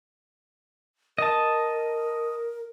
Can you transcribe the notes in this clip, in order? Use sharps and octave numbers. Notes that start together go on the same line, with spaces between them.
A#4 D#5 A5